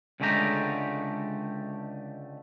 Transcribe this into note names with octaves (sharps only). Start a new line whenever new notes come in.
C#2 D3 G#3 A3 G4 A#5